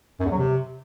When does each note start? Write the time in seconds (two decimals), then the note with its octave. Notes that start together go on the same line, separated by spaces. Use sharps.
0.19 F#2
0.26 E2
0.32 F#3
0.38 C3